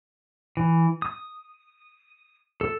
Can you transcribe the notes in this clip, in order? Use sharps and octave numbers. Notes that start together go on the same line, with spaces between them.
E3
D#6
A4